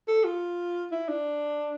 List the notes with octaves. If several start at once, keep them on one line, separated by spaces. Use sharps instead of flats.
A4
F4
E4
D4